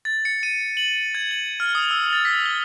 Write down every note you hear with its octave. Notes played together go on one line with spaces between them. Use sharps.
A6
C#7
D#7
F#7
G#6
F#7
F6
D#6
E6
A6
B6
G7